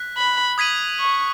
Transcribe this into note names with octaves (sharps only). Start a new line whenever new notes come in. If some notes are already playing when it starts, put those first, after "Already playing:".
Already playing: F#6 B6
B5
D#6 G#6 B6 D#7 F#7
C#6